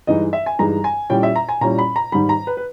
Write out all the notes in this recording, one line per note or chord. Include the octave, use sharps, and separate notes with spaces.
G2 E3 G#3 D#4 D#5
E5
G#5
G2 E3 G#3 D#4 A#5
G#5
A#2 G3 C#4 E4 G5
E5
A#5
G#5
A#2 G3 C#4 E4 A#5
B5
A#5
G#2 D#3 G3 B5
A#5
B4
B4